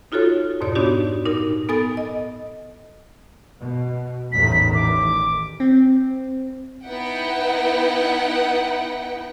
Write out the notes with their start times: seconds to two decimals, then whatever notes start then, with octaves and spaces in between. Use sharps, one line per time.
0.12 D#4 F4 F#4 A4 C#5
0.61 F2 G#2 B2 C#5 D5
0.75 B3 D4 D#4 F#4 G4
1.25 A#2 D#4 A#4
1.69 B3 A4 G#5 D#6 A6
1.97 D#5
3.59 B2
4.32 A1 E2 D#3 B6
4.74 D6
5.60 C4
6.84 B3 D#4 E4 F#5 G5